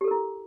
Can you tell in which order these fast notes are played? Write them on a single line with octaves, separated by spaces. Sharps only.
G4 A4 A#4 E4